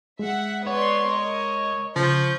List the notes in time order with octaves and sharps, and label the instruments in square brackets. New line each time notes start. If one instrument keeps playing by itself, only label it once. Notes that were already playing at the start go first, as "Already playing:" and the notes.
[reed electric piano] G#3 [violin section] E5 F#5
[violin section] B3 D5 C6 [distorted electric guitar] C#5
[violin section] A#4 D#5
[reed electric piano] C#3 [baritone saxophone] F3 [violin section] C#6 G6